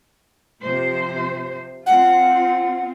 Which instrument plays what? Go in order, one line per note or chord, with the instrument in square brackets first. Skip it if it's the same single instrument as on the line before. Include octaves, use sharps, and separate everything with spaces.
[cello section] C3 F3 C5
[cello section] C4 F4 [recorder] F#5